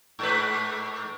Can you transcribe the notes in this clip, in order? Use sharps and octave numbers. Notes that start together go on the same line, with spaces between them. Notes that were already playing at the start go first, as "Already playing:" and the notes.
G#2 B4